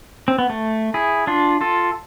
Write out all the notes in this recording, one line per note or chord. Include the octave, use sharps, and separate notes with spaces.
C4
B3
A3
E4 G#4
D4 F4
F4 A4